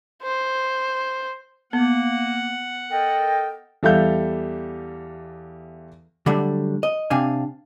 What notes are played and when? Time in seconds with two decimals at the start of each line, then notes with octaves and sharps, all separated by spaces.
0.22 C5
1.73 A#3 B3 F#5
2.91 A4 A#4 D#5 G5
3.83 E2 G3 A4 E5 F5 G6
6.26 D3 F#3 G3 A3 D4
6.83 D#5
7.10 C3 C4 D4 F5 G#5